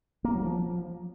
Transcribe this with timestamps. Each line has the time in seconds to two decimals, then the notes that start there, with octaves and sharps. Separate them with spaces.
0.24 A#3
0.35 F#3
0.45 F3